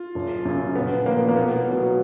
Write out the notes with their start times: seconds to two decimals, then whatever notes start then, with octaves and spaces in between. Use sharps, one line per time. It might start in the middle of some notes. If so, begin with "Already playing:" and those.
Already playing: F4
0.15 F#1
0.45 F#2 C#3
0.75 A#1 B3
1.06 A#2 F3 A#3
1.29 A#3
1.36 B1 B3
1.66 B2 F#3